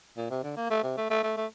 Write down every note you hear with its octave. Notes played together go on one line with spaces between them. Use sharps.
A#2
C3
D3
A#3
A3
C3
A3
A3
A3
A3